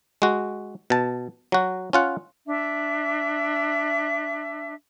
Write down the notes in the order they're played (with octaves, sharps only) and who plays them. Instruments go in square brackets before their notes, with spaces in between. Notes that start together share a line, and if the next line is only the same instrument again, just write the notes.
[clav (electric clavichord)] G#3 F#4
B2 A5
F#3 F#4
C#4 F4 F#5
[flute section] D4 E5